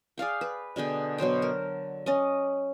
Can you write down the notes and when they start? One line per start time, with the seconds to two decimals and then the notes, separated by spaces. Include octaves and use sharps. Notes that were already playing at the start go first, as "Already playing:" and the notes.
0.18 G#4 D5 F5 G5
0.41 B4
0.76 B2 D3 G#4 G5
1.18 B2 F#3 C5 G5
1.42 A#4
2.06 C#4 D#5